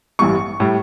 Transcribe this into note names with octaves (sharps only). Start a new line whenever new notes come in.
A1 G2 E3 G3 C#6
A2 G3